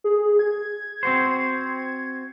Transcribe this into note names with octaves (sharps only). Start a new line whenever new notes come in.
G#4
G#6
C4 F#4 C5